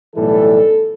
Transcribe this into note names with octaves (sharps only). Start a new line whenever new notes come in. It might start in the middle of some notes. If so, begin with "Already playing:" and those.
B1 A2 E3 G3 A4